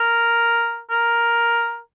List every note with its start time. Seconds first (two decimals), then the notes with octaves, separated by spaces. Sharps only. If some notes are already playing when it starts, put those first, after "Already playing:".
Already playing: A#4
0.90 A#4